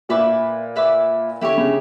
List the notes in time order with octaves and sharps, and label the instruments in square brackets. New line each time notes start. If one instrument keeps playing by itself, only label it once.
[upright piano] A#2 [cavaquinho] B4 E5 B5 D6
[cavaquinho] B4 E5 B5 D6
[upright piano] D3 [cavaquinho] E4 G4 C#5
[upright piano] C#3